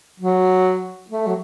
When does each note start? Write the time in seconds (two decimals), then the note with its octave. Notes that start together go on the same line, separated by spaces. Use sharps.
0.20 F#3
1.10 A3
1.27 F#3